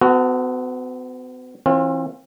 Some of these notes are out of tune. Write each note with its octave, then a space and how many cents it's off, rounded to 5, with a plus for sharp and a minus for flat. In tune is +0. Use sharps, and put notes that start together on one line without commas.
B3 +45 F#4 +0 A4 +20
E3 +5 C4 +45 F4 +25